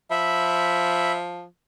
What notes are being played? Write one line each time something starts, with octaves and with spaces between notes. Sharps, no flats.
F3 E5 B5